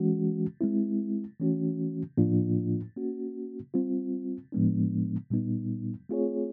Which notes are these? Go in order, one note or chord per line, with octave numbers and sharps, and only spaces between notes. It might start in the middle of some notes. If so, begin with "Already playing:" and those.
Already playing: E3 G#3 C#4 F#4
G#3 C4 E4
E3 A3 C#4 F#4
A2 F3 A#3 D4 F4
A#3 C#4 F#4
G3 C4 F4
A2 F3 G#3 B3 D4
A#2 G3 B3 D#4
A3 C4 F4 G#4 C#5